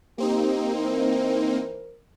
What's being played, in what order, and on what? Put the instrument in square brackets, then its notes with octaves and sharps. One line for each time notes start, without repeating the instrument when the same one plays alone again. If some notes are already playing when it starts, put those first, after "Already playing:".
[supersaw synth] A#3 C4 D#4 [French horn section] G4
[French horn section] E3 A#4 C5